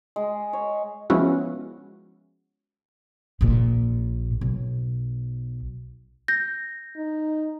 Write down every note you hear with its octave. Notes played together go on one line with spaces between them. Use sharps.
G#3
C#5
F3 G#3 B3 C#4 E4 F#4
A#1 A#2
B1
G6 A#6
D#4